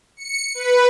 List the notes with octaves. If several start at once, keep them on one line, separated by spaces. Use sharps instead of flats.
C#7
B4